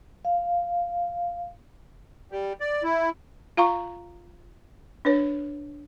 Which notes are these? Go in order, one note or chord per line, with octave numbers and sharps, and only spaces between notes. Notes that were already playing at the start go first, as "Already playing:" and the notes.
F5
G3
D5
E4
F4 F5 A#5 C#6
D4 B4 C#5